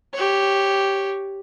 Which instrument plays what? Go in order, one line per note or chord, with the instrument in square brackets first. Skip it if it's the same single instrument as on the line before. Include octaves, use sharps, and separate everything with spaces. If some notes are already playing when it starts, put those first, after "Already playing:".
[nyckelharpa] G4 C#5